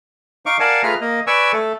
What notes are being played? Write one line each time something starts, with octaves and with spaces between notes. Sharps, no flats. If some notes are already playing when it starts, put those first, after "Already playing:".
D#4 F5 C#6 D6
A#4 D5 F5 F#5 G#5 A5
A3 F4 G#4 B4 A#5 F6
A#3 D#5
B4 D5 G#5 C#6 E6
A3 A4